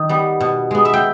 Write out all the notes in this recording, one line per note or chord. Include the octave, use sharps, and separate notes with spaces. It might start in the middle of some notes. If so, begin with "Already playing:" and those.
Already playing: D#3
G3 B3
B2
G#3 B3
E5
G5